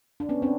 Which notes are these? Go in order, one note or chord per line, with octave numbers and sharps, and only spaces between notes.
D4
B3 C#4
C4 D4